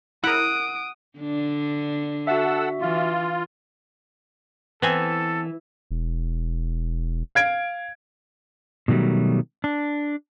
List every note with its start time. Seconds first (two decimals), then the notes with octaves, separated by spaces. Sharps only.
0.24 E4 A#4 F#5 D#6 D7
1.19 D3 D4
2.27 F#4 A4 E5 F#5 E6
2.81 E3 F4
4.82 E3 B3 C4 A4 G#5
5.91 E1
7.35 F5 G#6 D7
8.88 B2 D#3 F#3 G3 A3
9.64 D4